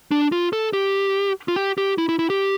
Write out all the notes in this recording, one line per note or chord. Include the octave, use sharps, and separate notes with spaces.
D4
F4
A4
G4
F4
G4
G4
E4
E4
E4
G4